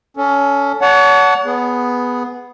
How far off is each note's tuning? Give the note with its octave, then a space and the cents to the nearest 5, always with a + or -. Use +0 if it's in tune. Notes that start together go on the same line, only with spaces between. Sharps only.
C#4 +20 A4 +0
C#5 +40 F#5 +0 A5 -10
B3 +0 G#4 +0